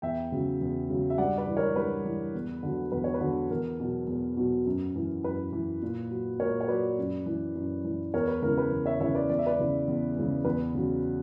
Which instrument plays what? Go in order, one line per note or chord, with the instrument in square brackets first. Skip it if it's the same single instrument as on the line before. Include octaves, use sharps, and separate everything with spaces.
[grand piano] E2 E5 G5
C#3 F#3
E2
C#3 F#3
E5
G2 D5 F#5
B4 D5
E3
A#4 C#5
G2 B4
E3
E2
D3 F#3
E2 B4
C#5
B4
D3 F#3
E2 A#4
B2 F#3
E2
B2 F#3
F#2
E3
F#2 B4
E3
A#2
F#3
A#2 A#4 C#5
C#5
F#3 B4 D5
F#2
E3
F#2
E3
E2 A#4 C#5
B4
C#3 E3 A#4
B4
E2
C#5 E5
C#3 E3 C#5 E5
B4 D5
E2 D5
E5
B4 D5
C#3 E3
E2
C#3 E3
E2 B4
C#3 F#3